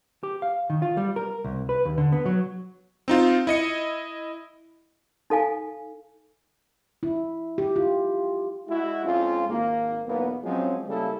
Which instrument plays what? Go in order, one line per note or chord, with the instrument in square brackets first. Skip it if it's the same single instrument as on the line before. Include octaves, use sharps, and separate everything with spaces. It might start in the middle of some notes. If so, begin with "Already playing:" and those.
[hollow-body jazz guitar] G4
F5
D#3
F4
G3
A#4
C2
B4
D#2
D3
B3
F#3
[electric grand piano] C4 D#4 F4
E4 D#5 C#7
[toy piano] D#4 A4 F5 G#5
[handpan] E4
G4
F4
[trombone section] G#3 E4 F#4
F2 G#3 C#4 F4
G#1 A#3
B1 E2 A#3 B3
F3 F#3 G#3 C4 C#4
C#3 G3 G#3 A#3 E4 A4